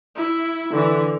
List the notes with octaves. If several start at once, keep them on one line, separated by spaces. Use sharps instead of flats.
E4
D3 E3